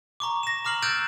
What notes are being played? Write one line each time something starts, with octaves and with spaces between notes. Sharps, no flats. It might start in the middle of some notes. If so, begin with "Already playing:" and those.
A#5 C#6 D6
A#6 E7
A#5 D6 F6 C7 F#7
E6 F#6 G6 A6 D7 E7